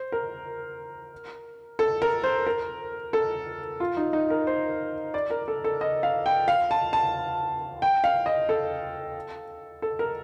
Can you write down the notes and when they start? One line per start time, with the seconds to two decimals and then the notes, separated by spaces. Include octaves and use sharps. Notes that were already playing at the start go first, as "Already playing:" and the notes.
Already playing: C5
0.12 A#4
1.79 A4
2.02 A#4
2.24 C5
2.47 A#4
3.13 A4
3.80 F4
3.97 D#4
4.13 D#4
4.30 A#4
4.47 C5
5.14 D5
5.30 A#4
5.48 A4
5.64 A4
5.81 D#5
6.03 F5
6.26 G5
6.48 F5
6.71 A5
6.93 A5
7.82 G5
8.04 F5
8.26 D#5
8.49 A4
9.82 A4
9.99 A#4